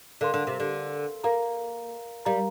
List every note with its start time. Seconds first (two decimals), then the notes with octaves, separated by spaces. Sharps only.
0.21 D3 A#4 F5 C6
0.34 D3
0.47 C3
0.60 D3
1.24 A#3 A#4 F5 A#5
2.25 G3 A#4 F5 A#5